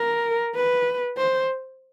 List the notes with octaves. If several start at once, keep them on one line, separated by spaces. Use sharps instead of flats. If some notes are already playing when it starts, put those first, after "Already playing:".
Already playing: A#4
B4
C5